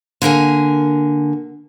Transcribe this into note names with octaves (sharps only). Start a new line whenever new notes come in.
D3 A#3 A#4 G#5